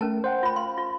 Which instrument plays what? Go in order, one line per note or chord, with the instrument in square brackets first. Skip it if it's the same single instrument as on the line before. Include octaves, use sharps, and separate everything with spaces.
[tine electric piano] A3 [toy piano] C#4 A#4 A5
[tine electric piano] C5 F#5 G5
[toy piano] F4 B5
[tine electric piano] F5 [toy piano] C6
[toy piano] F4